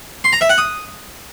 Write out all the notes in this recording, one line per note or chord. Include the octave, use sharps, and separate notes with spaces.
C6
A#5
E5
F#5
D#6